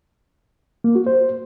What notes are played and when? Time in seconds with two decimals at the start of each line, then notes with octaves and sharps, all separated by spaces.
0.84 A#3
0.95 F#4
1.06 C5